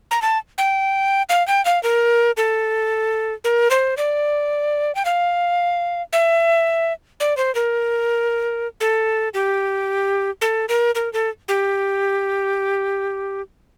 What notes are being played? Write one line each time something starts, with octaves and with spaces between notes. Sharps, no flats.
A#5
A5
G5
F5
G5
F5
A#4
A4
A#4
C5
D5
G5
F5
E5
D5
C5
A#4
A4
G4
A4
A#4
A#4
A4
G4